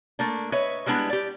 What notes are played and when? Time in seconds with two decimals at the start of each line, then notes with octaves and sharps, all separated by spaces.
0.19 A3 A#3 D4
0.52 B4 C#5 D#5 E5
0.86 G3 G#3 B3 D4 E4
1.10 G4 D5